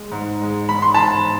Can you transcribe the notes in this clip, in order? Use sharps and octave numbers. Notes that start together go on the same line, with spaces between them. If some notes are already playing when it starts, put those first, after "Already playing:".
Already playing: G#3
G#2
G#3
G#2 B5
C6
G#2 A5 B5